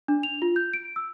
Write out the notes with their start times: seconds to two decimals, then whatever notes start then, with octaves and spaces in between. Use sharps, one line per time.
0.08 D4
0.23 F7
0.42 F4
0.56 G6
0.73 D7
0.96 E6